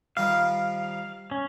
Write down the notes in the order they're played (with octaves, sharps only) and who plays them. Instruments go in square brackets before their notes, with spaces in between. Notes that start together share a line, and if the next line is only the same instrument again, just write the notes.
[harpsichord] D#3 F3 G3 [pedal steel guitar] F5
[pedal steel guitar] C#4